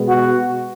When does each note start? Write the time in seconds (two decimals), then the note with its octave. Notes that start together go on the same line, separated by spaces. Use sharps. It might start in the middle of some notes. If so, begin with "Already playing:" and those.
Already playing: B2 G#3 B3
0.08 F#4